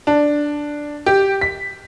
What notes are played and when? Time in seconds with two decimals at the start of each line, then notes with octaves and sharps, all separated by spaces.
0.07 D4
1.06 G4
1.41 B6